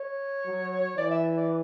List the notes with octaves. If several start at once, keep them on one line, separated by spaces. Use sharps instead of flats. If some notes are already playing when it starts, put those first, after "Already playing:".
Already playing: C#5
F#3
E3 D5
E5
D5